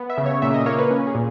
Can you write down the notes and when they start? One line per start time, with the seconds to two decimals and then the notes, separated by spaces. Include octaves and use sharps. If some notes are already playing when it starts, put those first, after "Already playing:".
Already playing: B3
0.10 E5
0.18 C#3
0.26 C#5
0.42 A#2 E5
0.54 D#5
0.66 A#3 C#5
0.78 B4
0.91 C#4
1.07 G#4
1.15 A#2